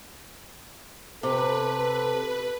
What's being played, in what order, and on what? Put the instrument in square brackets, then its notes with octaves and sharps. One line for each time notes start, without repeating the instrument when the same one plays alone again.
[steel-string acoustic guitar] C3 [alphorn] A4 [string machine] B4